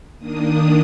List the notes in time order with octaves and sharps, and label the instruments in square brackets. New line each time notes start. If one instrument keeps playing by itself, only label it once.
[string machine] D#3 A#3 D4 D#6